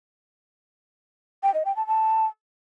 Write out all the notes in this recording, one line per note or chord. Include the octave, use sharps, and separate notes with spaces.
G5
D#5
G5
A5
A5